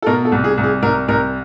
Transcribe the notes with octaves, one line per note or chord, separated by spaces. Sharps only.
A4
B2 A#4
A4
C2
G#4
C2
G#4
C2 A#4
C2 A#4